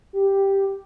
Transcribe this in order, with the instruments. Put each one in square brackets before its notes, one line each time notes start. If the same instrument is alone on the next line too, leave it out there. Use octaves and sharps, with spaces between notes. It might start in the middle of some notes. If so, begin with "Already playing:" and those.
[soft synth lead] G4